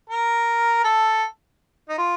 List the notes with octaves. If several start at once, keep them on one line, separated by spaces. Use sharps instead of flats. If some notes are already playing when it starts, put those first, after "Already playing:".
A#4
A4
D#4
F4